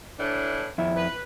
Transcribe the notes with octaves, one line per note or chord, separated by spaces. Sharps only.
A2 E3 D4
F2 E4
B4